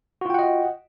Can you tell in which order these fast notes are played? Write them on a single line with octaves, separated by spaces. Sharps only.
F#4 F4 G5 F#5 D#5